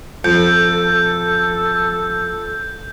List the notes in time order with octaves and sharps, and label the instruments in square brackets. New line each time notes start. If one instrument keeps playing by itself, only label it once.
[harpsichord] F2 [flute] A4 [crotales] G6